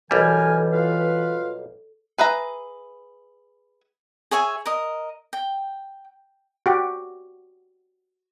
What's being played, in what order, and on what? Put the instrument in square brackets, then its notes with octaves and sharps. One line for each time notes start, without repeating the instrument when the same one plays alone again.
[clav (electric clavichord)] B1 G3 [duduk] E3 [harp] A4 C#5 [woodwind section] A#4 G#5
[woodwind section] F4 B4 F5
[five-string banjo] G#4 B4 E5 A#5
[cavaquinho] G#4 C#5 E5 G#5
A#4 D#5
G5
[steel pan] F#4 G4